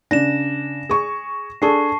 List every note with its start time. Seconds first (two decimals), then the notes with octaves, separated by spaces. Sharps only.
0.11 C#3 D4 A#6 E7
0.89 G#4 C#6
1.62 D4 G#4 A4 A5 C#6 C7